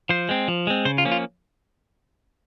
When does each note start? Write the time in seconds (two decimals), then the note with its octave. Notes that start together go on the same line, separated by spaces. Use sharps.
0.09 F3 C5
0.29 G#3 C4
0.48 F3
0.67 G#3 C4
0.85 C#3 C5
0.98 F4
1.05 F3 A#3 C#4
1.12 F4